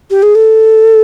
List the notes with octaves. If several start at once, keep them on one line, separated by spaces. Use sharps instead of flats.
G4
G#4
A4